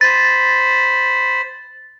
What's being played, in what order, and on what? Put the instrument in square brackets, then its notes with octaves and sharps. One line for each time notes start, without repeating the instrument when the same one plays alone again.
[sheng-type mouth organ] C5 B5 [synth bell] A6